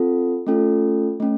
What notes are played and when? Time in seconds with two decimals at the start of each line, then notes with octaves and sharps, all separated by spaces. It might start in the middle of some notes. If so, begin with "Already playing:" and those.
Already playing: C4 F4 A4
0.47 A3 C#4 F4 A4
1.20 A3 C#4